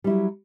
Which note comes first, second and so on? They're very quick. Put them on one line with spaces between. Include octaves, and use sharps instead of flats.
G3 E4 F#3